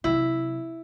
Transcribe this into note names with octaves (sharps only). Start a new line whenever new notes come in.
C3 F#3 E4